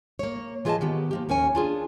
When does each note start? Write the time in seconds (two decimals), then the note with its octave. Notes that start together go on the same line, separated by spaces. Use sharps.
0.19 A#3 C#5
0.65 E3 F4 G#4 B4 D#5 A5
0.81 D#3 B3 G4
1.11 F3 A#3 G4
1.29 D#2 C#4 A#4 C#5 G#5
1.55 D4 F4 G#4